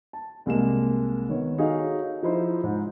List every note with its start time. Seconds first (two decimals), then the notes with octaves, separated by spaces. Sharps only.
0.13 A5
0.46 C2 G#3 A#3 E7
1.29 D#3 B3 C#5
1.58 D#4 F#4 G#4 A4 C#5 F5
2.23 F3 D#4 E4 C5
2.63 G#2